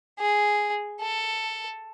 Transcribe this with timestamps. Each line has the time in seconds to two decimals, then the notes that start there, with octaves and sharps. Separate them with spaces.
0.19 G#4
1.01 A4